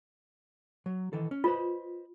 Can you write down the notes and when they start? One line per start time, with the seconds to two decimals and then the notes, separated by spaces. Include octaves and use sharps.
0.86 F#3
1.13 D#3 E3 A4
1.31 C#4
1.44 F4 B4 C5 D#5